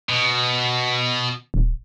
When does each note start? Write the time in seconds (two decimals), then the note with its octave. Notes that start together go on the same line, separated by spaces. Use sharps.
0.09 B2
1.54 D#1